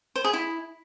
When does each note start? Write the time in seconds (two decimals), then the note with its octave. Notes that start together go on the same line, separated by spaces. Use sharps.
0.16 C5
0.24 G#4
0.33 E4